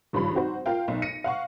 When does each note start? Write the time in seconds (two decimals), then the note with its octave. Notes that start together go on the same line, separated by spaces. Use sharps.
0.13 G#1 G2 C#3 F3 B5
0.34 C4 D#4 F#4 C5
0.66 F4 A#4 F5 G5
0.88 B1 D#4
1.02 A#6 C#7 D#7
1.24 F5 F#5 C#6